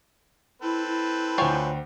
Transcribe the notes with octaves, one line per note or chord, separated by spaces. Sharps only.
C4 E4 A4 B4
E4
D2 F4 C5 C#5 G5 G#5